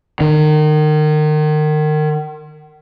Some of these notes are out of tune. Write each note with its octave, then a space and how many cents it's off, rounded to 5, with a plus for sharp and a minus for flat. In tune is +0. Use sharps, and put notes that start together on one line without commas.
D#3 -30